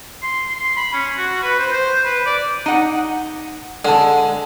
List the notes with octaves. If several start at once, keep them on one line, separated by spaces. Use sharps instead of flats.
C6
C6
B5
C#4
F#4
B4
C5
C5
B4
D5
D#4 F#5
D3 G#3 A5